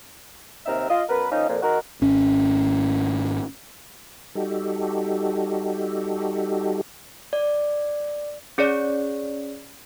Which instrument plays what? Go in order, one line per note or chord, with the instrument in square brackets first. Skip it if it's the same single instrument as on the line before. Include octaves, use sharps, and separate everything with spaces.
[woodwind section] D#2 C3 C4 D#4 A#4 E5
F4 D#5
F#2 B3 A#4 B4
D#3 F3 A#3 C#4 D#4
F2 A#2
D#3 G#3 D#4 F#4 A#4
[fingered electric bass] G#1 C#4
[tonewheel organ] G3 D#4 F#4 G4 A4
[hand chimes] D5
[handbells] C#4 G#4 C#5 D5